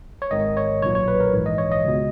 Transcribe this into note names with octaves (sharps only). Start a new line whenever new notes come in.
C#5
G#1 G#2 D#3 D#5
C#5
B1 A#2 C#5
C#5
B4
A#4
A#1 G#2 E3
D#5
C#5
D#5
C#2 B2